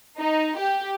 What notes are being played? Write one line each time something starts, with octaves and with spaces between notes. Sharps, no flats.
D#4
G4